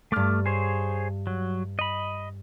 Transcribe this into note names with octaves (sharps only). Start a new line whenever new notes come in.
G2 A3 D6 F6 A6
G#4 C5 C#5
F#3
D#5 B5